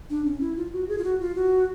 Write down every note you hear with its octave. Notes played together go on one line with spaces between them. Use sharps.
D4
C#4
E4
F4
F#4
G#4
F4
F#4
F4
F#4